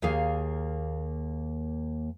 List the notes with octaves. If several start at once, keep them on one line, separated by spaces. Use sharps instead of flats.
D#2 A#3 G#4 F5